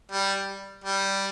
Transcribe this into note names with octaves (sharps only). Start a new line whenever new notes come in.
G3
G3